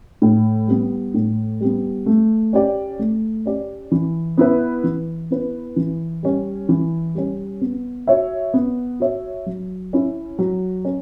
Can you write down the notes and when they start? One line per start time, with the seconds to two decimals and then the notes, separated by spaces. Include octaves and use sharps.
0.22 A2
0.68 G3 B3
1.14 A2
1.61 G3 B3
2.06 A3
2.53 C#4 G4 D5
2.99 A3
3.46 C#4 G4 D5
3.92 E3
4.37 B3 E4 B4
4.84 E3
5.30 B3 E4 B4
5.76 E3
6.23 G3 C#4
6.69 E3
7.15 G3 C#4
7.61 B3
8.07 F#4 C#5 E5
8.54 B3
9.00 F#4 C#5 E5
9.46 F#3
9.93 C#4 E4
10.39 F#3
10.85 C#4